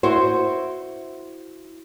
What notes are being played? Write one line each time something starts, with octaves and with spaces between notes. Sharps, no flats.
E4 F#4 C5